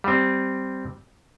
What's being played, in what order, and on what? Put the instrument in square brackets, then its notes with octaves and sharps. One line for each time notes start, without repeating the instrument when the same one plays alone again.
[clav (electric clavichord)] G3 C4